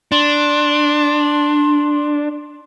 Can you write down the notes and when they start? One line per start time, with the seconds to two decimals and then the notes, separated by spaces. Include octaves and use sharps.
0.12 D4 C6